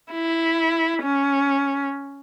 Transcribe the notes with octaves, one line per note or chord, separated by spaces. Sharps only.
E4
C#4